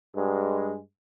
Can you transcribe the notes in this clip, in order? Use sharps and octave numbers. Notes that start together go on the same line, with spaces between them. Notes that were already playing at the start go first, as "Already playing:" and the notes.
G2 G#3